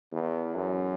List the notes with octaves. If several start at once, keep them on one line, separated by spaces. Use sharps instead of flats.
E2
F#2